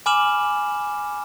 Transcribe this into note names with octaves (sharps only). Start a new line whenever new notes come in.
G#5 B5 D6 F6 E7 F#7